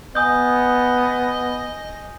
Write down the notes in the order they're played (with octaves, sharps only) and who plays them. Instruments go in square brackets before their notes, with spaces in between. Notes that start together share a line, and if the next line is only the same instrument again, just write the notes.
[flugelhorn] B3 [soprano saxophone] D#5 [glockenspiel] G#5 D#6 G6